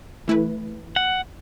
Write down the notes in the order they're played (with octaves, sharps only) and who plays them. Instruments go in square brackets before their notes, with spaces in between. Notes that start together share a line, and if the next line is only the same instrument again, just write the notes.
[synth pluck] E3 A3 E4 B4
[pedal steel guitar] F#5